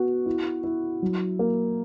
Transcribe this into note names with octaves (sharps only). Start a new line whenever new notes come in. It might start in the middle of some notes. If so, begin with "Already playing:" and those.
Already playing: B3 F#4
E4
E4
F#3
A#3